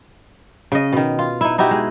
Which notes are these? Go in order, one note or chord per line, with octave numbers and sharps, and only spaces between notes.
C#3 D#5
B2 D#3
F4
D#4 E4
D#4 E4 F#4 G4
G#3